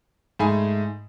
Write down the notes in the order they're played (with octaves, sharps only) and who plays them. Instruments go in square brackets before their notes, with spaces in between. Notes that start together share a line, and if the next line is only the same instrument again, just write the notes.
[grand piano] G#2 A3 G#4 G#5 B5